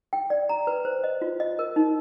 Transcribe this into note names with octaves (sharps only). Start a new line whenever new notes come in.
G5
D5
A#5
B4
C5
D#5
F4
D#5
A#4
D#4